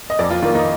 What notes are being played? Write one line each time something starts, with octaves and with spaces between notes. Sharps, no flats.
D#5
F2 D5
F4
D#3 A#3 F4
D#4